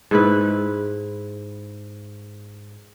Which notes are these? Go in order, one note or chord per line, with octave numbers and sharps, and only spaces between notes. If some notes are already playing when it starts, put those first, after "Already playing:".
G#2 E4 B4